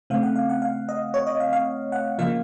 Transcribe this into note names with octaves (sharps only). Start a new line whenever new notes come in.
C#3 A3 C4 F5
F#5
F5
F#5
F5
D#5
C#5
D#5
F5
F5
F#5
C#3 F3 A#3 F4 F5